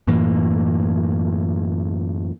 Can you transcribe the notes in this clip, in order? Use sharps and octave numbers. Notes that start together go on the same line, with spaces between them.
F#2 A2 E3 A#3